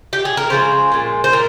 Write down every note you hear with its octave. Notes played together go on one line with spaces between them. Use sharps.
G4
G#4
A#4
C#3 F3 G#3 C5
A#2 G#3
C5
A#2 A#4